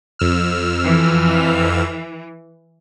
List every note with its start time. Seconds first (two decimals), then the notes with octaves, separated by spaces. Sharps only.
0.19 F2 E6 F6
0.84 E3